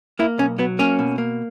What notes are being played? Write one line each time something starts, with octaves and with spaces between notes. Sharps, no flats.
A#3 E4
B1 C#4
F#3 B3
A#3 C#4
B2
A#3